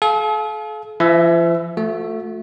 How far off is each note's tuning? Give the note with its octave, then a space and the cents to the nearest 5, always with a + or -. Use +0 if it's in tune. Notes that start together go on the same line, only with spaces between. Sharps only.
A4 -45 F5 +0
F3 -45 E5 +0
A3 +10 F#4 -45